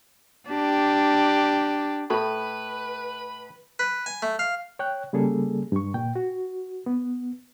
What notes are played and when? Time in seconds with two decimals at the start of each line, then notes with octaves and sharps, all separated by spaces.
0.48 D4 G4
2.10 A2 A4 B4 B5
3.79 B4
4.06 G#5
4.22 A3
4.39 F5
4.79 C#5 G5 F#6
5.13 C#3 G3 A#3 G#4 A4
5.72 G2 C#6
5.94 A#2 G5
6.16 F#4
6.86 B3